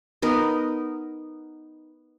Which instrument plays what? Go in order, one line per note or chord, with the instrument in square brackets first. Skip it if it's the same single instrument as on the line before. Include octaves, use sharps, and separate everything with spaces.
[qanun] B3 D#4 A#4